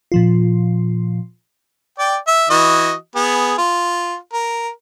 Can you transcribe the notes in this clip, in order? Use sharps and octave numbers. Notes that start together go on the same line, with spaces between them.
A#2 F3 F4
D5 G5
E5
E3 F#4 D#5
B3 G#4
F4
A#4